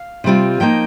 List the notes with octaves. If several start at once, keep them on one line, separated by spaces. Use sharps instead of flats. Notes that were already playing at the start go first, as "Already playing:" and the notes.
Already playing: F5
C3 G3 C4 F4
F3 A#3 D#4 G5